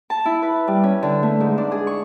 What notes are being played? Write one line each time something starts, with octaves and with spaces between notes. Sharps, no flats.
A5
E4
B4
G3
C#4
D3
A3
G#2
D4
G#4
C#6